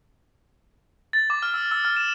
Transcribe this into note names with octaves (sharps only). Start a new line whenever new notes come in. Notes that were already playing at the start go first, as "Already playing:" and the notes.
A6
D6
F6
E6
E6
F6
E7